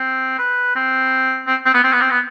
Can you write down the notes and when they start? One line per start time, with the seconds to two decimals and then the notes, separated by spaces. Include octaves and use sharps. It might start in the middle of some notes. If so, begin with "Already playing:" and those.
Already playing: C4
0.39 B4
0.76 C4
1.47 C4
1.65 C4
1.74 B3
1.83 C4
1.92 B3
2.01 C4
2.10 B3